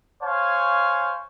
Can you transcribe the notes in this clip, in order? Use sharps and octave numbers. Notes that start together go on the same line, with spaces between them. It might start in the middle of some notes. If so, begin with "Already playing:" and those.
C5 C#5 F5 G#5